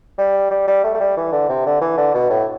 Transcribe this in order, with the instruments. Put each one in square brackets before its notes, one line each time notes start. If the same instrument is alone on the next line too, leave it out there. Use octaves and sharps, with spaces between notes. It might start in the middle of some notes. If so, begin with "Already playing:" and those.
[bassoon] G3
G3
G3
A3
A3
G3
E3
D3
C3
D3
E3
D3
B2
A2